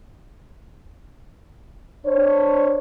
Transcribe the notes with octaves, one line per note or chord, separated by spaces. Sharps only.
D4 C5 C#5